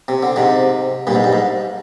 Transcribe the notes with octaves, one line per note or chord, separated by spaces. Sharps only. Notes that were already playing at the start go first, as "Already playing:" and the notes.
C3
D3
G#2 C3
G2 A#2
G#2
G2
G#2